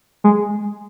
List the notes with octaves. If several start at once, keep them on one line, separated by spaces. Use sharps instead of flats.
G#3